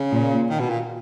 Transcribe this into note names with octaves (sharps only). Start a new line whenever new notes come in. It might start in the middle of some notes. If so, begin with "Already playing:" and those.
Already playing: C#3
A#2
D#3
B2
A#2